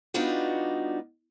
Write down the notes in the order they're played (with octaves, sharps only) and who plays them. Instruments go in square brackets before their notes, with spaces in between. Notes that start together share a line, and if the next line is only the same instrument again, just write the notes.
[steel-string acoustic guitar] G3 B3 D4 D#4 F4 F#4